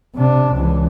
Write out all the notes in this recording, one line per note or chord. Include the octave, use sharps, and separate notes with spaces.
C3 D4
C#2 E3